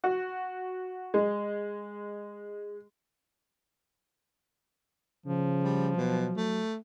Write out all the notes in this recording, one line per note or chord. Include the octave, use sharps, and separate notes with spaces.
F#4
G#3
C#3 F3
G3
B2 F#3
A3